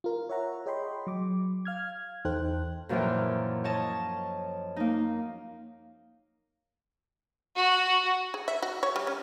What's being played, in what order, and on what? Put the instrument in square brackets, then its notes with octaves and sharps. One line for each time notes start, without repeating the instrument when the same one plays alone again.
[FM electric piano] F4 A#4
C#5 E5 F#5 A#5
G#4 C#5 D#5 G5 B5 C6
F#3 D6
F5 F6 G#6
E2 D#4 A4 C5 G5 F#6
[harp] F#2 A#2 E3 F3 G5
C#5 D#5 A5
A#3 D#4
[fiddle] F#4
[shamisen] G#4
E5
F#4
C#5
G3
C#4